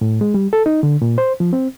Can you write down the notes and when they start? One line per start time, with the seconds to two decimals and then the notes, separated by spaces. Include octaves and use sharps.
0.01 A2
0.21 G#3
0.34 G3
0.53 A4
0.66 D#4
0.83 D3
1.02 A#2
1.18 C5
1.40 F3
1.53 C4